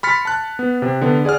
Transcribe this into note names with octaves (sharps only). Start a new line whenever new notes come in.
B5 C6 F6 A6 B6 C#7
A5 F#6
B3
C3
D3 B3
G#4 D5 F#5 F6